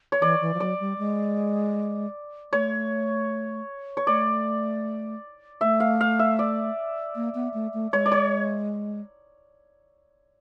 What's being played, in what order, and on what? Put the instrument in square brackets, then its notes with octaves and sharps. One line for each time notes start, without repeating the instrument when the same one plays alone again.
[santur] C#5
[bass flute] E3 [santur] D5
[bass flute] E3
F3
[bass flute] F#3 [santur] D5
[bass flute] G3
G#3
[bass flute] A3 [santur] C#5
[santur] C#5
[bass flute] A3 [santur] D5
[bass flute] A3 [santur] E5
[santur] F5
F5
E5
D5
[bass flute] A#3
B3
A3
A3
[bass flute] G#3 [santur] C#5
[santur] D5
C#5